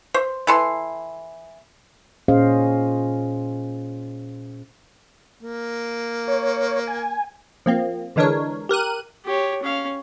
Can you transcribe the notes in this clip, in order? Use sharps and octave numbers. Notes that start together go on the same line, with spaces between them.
C5
E3 A4 C6
A#2 C#4 G#4 C5 D#5 F5
A#3
C#5
G#5
F3 A#3 C4
D3 E3 G#3 D4 A#4 C#5
G4 A#4 F#6 D#7
G4 C#5
C#4 F5